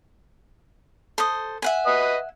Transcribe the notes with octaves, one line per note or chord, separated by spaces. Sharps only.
A4 C5 D#6
E5 F#5 G#5
B4 D#5 D#6